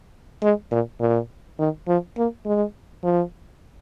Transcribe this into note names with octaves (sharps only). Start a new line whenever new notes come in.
G#3
A#2
A#2
D#3
F3
A#3
G#3
F3